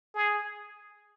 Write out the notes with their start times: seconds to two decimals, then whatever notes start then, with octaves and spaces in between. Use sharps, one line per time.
0.14 G#4